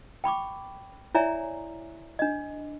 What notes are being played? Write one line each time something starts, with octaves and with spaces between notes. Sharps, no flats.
G5 B5 C#6 D6
E4 C#5 D5 E5 G#5 A#5
D4 D#5